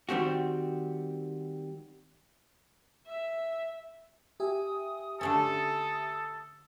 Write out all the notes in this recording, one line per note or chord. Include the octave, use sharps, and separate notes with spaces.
D#3 G3 C4 F#4
E5
G4 E5 G#5 D#6
D3 A3 C#4 A4 D#6